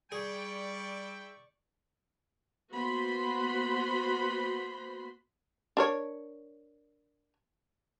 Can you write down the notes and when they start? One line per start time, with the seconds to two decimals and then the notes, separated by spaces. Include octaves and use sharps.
0.12 G3 E4 G#4 D5 G5 C#6
2.73 A#3 B3 F#4 C5 B5 C6
5.77 D4 A#4 C#5